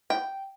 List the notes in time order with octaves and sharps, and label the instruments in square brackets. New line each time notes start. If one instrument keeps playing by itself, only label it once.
[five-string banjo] G5